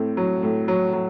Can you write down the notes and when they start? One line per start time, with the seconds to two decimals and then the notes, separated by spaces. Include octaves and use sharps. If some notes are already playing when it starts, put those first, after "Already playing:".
Already playing: A2 C4
0.17 F#3
0.43 A2
0.68 F#3
0.93 F#3